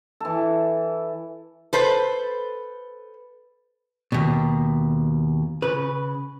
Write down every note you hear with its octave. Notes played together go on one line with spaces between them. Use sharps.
E3 A4
A4 B4 C5
D#2 B2
C#3 B4